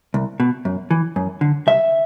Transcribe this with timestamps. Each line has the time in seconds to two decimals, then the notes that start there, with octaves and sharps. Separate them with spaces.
0.14 C2
0.40 B2
0.65 F#2
0.91 E3
1.16 F#2
1.41 D3
1.67 C2 E5